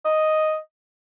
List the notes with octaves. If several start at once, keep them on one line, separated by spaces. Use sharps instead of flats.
D#5